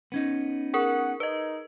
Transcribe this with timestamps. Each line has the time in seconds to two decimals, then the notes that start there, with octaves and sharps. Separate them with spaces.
0.12 B3 C#4 D#4
0.74 G#4 A#4 F#5
1.20 D#4 B4 D#5